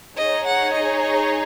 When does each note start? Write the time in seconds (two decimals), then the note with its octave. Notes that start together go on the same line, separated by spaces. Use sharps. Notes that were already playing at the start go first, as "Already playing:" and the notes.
0.17 D#4 G#4 C#5 D#5
0.46 F#5
0.74 D#5
1.01 D#5